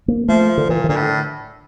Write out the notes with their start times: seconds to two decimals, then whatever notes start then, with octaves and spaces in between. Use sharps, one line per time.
0.08 A#3
0.29 F3 A3
0.57 D3
0.69 A#2 E3
0.84 E3
0.89 A#2 D3
0.96 A2